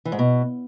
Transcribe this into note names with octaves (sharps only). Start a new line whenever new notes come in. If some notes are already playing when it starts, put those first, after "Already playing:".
E3
G#2
B2